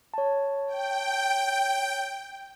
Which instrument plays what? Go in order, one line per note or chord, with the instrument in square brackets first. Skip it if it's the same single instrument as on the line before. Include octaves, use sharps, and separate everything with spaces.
[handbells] C#5 A5
[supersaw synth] G5